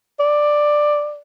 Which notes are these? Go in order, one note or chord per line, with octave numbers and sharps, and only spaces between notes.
D5